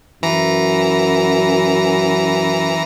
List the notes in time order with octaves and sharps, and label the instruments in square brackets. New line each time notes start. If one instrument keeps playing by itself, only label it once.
[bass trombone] F#2 [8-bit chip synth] E3 A#5